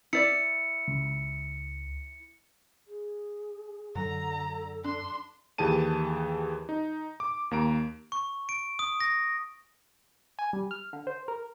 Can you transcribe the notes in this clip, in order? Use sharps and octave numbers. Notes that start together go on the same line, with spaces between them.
E4 D5 C#7
C#2
G#4
F#2 D3 F#3 A4 A#5
D4 C6
D#2 E3 G4 G#4 A5 D#7
D#4
D6
D#2 A#3 A#5 D7
C#6
D7
D#6
A#6
G#5
G3
F6
D3
C5
A#4